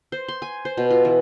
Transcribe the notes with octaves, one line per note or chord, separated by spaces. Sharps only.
C5
C6
G#5
C5
B2
F4
E3